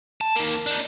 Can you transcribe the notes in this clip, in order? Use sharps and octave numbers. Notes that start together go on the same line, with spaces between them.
A5
D#3 A#3
D4 D#4